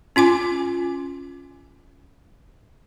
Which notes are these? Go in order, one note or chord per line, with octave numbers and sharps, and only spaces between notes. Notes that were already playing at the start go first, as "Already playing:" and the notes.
C#4 F4 G#5 D6